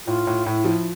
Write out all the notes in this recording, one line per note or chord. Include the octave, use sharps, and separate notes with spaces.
A2 F4
A2
A2 E4
F3